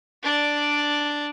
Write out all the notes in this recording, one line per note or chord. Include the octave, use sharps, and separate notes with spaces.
D4 D5